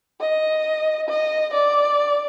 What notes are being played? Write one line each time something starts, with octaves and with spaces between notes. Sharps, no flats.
D#5
D#5
D5